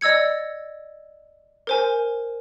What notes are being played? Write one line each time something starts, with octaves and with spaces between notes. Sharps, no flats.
D5 D#5 E6 G#6 C#7
A#4 C5 G#5